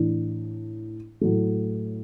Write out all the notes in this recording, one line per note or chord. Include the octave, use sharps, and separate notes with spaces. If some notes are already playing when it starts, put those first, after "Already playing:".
Already playing: A2 E3 D4
A2 F#3 A3